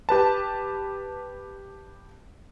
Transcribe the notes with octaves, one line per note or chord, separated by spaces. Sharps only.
G4 B4 A5